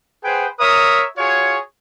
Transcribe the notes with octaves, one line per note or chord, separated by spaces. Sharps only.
G#4 B4 C5 F#5 G5
A#4 C#5 E5 D#6
F4 F#4 G#4 C#5